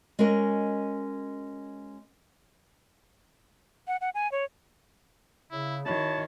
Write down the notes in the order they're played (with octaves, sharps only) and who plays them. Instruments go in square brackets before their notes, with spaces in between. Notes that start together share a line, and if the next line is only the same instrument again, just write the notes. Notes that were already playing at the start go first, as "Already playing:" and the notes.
[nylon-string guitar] G#3 C#4 F#4 A#4 D#5
[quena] F#5
F#5
G#5
C#5
[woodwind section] C#3 [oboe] E4
[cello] D#3 [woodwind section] E4 F#4 C#5 [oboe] A5